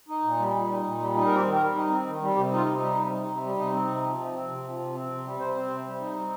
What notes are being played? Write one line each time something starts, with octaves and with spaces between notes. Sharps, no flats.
D#4
A#2
G3
A#2
D#4
A#2
G3
D#4
C4 A#4
G4
D#3
A#4
G3
D#4
C4
D#3
G3
C3 G4
D#4 F4
C3
G3 D#4
C3
D#4
C3
G3
C3 D#4
C4
C3
F3
C3
C4
C3
F3
C3
C4
C3
G3
C3 C5
C4
C3
G3
D#4
C4